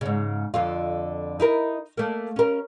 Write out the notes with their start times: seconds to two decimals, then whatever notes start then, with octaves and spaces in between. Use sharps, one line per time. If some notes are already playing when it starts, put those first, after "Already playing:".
0.01 G#2 C#3
0.54 F2 D3 F4
1.40 D#4 E4 A#4
1.97 A3 A#3
2.36 C#4 A#4